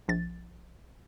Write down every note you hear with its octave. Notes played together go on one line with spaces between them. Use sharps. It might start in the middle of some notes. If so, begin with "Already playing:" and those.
A#1 A6